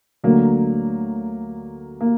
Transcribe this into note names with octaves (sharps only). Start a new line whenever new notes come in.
D2 D3 F#3 A#3
A#3